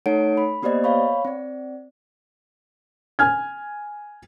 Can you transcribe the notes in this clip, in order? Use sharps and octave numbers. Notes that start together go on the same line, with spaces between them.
A3 D#4 A4 C#5 F#5 D7
B5
A#3 B3 G4 C5 D5 D#5
C#5 F5 B5 C#6
C4 D5
G#5 F6 G#6